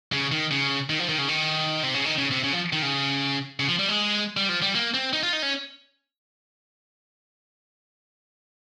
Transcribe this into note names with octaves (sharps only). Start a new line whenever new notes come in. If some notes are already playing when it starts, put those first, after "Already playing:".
C#3
D#3
C#3
D#3
F3
D#3
C#3
D#3
C3
C#3
D#3
C#3
C3
C#3
F3
D#3
C#3
C#3
F3
G3
G#3
G3
F3
G3
A#3
C4
D#4
F4
D#4
C#4